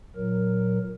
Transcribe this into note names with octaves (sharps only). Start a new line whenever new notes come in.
A#2 F#3 A#4